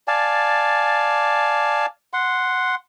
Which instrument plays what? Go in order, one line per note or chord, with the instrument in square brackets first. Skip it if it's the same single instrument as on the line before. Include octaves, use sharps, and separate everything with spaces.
[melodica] D5 F5 G#5 A5
F#5 C6